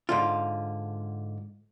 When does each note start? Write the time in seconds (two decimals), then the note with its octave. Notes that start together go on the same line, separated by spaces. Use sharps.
0.09 G#2 D3 F4